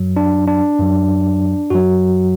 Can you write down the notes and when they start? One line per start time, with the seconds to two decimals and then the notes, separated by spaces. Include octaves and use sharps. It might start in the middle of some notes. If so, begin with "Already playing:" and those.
Already playing: F#2 F#3
0.16 D4
0.48 D4
0.79 F#2 F#3
1.70 F#2 F#3 F#4